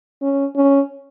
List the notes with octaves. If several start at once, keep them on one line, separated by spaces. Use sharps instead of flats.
C#4
C#4